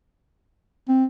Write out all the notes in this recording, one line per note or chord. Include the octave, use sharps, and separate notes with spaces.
C4